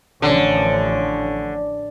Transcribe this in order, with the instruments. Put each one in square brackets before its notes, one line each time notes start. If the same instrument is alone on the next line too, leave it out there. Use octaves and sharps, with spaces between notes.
[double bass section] A1 F3 C#4 [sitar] D3